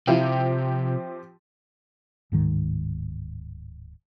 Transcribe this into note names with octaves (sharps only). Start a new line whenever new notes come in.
C3 F3 C4 E4 F4 G4 C5
D1 G#2 D#3